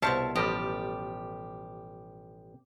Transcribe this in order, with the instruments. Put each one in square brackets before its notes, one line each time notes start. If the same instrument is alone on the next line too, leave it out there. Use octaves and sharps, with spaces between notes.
[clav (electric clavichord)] C2 E4 C#5 [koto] B2 C5 F5 [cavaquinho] A5 C#6
[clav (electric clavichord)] A1 F3 G3 [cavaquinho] G4 [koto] D#5